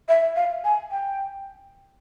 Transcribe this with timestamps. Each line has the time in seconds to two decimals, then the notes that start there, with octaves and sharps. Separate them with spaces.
0.09 E5
0.36 F5
0.64 G#5
0.91 G5